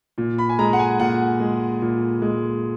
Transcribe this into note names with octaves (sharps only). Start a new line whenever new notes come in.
A#2
B5
G#5
G#3 A#5
F#5
G#5
A#2 F#5
G#3
A#2
G#3